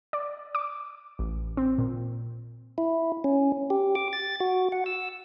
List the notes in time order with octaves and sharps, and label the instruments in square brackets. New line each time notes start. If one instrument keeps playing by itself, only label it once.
[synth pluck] D5
D6
A1
C4
A#2
[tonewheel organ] E4
C#4
G4
D6
A6
F#4
F#5
E6